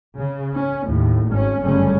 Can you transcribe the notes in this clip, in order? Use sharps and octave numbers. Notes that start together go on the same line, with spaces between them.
C#3
C#4
D#2 A2
G#1 C#4
G1 F#2 C#3 G3 A3 C#4